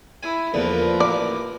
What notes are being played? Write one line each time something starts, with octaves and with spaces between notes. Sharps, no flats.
E4 G#5
E2 D3 F3 A#3 B3 A#4 B4
A1 D5 D6